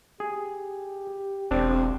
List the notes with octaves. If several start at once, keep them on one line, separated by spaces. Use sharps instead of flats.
G4 G#4
E1 C4 D4